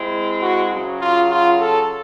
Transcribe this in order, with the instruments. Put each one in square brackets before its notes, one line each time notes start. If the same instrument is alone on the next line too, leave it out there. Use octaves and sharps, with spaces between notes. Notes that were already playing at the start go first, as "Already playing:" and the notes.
Already playing: [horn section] G#3 C4 E4
[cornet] F#4
[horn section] F#2 C#3 F#3
[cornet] F4
F4
A4